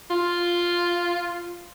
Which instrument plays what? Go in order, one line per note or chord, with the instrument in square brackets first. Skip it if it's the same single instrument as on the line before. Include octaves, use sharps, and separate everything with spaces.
[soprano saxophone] F4